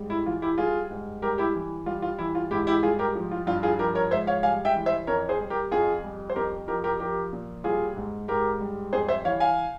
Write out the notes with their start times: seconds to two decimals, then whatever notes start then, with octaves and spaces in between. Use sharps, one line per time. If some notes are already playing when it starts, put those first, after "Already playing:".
Already playing: G#2 G3
0.10 E4
0.26 E3 F4
0.42 E4 G4
0.58 G3 F4 G#4
0.91 G#2
1.22 G3 G4 A#4
1.38 E4 G4
1.55 E3
1.86 G3 F4
2.02 F4
2.19 E3 E4
2.35 F4
2.51 G#2 E4 G4
2.67 E4 G4
2.83 G3 F4 G#4
2.99 G4 A#4
3.15 F3
3.31 F4
3.47 G2 F4
3.63 F4 G#4
3.79 F3 G4 A#4
3.95 A#4 C#5
4.11 G#2 C5 E5
4.27 C#5 F5
4.43 G3 F5 G#5
4.65 E5 G5
4.75 E3
4.86 C5 E5
5.07 F2 A#4 C#5
5.29 G#4 C5
5.40 G3
5.50 G4 A#4
5.71 F2 F4 G#4
6.04 G3
6.30 C5
6.36 F2 G4 A#4
6.68 F3 G4 A#4
6.84 G4 A#4
7.00 F3 G4 A#4
7.33 A#2
7.64 G3 F4 G#4
7.96 G#2
8.28 G#2 G4 A#4
8.61 G3
8.93 F2 G#4 C5
9.08 C5 E5
9.25 E3 C#5 F5
9.40 F5 G#5